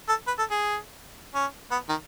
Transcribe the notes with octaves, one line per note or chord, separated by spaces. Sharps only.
A4
B4
A4
G#4
C#4
B3
D#3